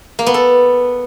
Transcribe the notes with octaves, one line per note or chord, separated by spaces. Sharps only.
A#3
B3
A4